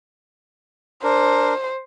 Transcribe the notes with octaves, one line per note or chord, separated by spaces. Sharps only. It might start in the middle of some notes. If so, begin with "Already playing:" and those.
D4 A#4 C5